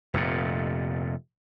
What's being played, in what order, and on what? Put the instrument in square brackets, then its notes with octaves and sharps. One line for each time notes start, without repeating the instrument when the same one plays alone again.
[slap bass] F1 F2 A#2